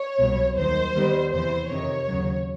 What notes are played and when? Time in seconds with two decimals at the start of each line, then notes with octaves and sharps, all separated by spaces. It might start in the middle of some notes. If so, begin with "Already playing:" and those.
Already playing: C#5
0.19 C2 B2 F#3
0.57 D#2 D#3 F#3 C5
0.94 D#2 D#3 G3 B3
1.32 E2 C3 E3 C5
1.69 F2 C3 D#3 C#5
2.07 D#2 C#3 F#3